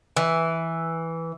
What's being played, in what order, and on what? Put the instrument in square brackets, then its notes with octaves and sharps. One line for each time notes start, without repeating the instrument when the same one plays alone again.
[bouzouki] E3